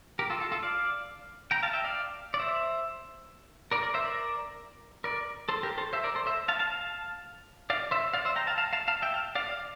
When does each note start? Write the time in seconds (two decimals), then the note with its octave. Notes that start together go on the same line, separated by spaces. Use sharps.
0.19 G4 A#4
0.30 F4 A4
0.40 F4 A4
0.52 F4 A4
0.63 D5 F5
1.51 G5 A#5
1.63 F5 A5
1.73 E5 G5
1.84 D5 F5
2.34 D5
2.40 C5 E5
3.71 A#4 D5
3.82 A#4 D5
3.94 C5 E5
4.05 A#4 D5
5.04 A#4 D5
5.49 A4 C5
5.63 G4 A#4
5.78 A4 C5
5.93 C5 E5
6.04 A#4 D5
6.15 A4 C5
6.26 C5 E5
6.48 F5 A5
6.59 F5 A5
6.70 F5 A5
7.70 D5 F5
7.91 C5 E5
8.14 D5 F5
8.25 C5 E5
8.36 G5 A#5
8.47 F5 A5
8.58 F5 A5
8.73 F5 A5
8.88 F5 A5
9.02 E5 G5
9.14 F5 A5
9.35 D5 F5
9.46 D5 F5